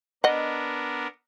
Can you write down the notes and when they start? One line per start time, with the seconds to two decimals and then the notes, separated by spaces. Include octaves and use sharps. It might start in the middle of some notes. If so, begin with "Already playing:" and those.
0.24 B3 D4 A#4 D#5 F#5